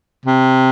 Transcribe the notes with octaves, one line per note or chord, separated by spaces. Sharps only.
C3